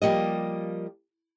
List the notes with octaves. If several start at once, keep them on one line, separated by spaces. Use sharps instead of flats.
F3 G3 A#3 D#5